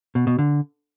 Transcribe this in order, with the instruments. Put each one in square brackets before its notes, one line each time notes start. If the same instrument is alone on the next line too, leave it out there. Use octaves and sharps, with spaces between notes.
[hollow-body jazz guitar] B2
B2
D3